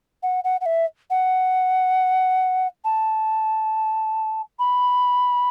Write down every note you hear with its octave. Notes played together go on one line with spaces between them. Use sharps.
F#5
F#5
F#5
E5
F#5
A5
B5